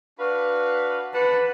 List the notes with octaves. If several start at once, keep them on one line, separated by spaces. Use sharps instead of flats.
D4 F#4 B4 F5
B4 D5 F#5 A5